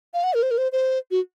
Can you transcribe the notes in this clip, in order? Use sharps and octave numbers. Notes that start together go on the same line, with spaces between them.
F5
F#5
A#4
C5
A#4
C5
C5
F#4